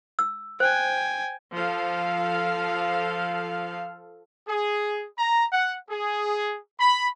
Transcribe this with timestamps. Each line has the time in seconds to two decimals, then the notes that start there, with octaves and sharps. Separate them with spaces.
0.19 E6
0.60 C5 G5 G#5
1.55 F3 A4 F5
4.48 G#4
5.18 A#5
5.53 F#5
5.90 G#4
6.80 B5